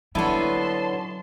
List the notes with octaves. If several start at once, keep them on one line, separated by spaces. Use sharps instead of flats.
D3 F#3 A#3 B3 C#4 E4 A5 C6